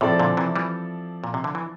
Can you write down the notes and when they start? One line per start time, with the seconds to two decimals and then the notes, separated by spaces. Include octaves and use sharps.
0.01 A2 C3 F3 C4 E4 A4 D5
0.19 A#2 D3
0.37 C3 E3
0.56 E3 G3
1.24 A#2
1.34 C3
1.44 D3
1.55 E3